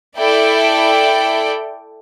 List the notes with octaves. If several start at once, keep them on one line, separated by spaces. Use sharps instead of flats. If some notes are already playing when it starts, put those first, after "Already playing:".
E4 A4 D5 G5